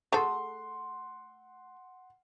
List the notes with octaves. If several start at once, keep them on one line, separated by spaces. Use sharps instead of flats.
A3 G#4 A4 F#5 C6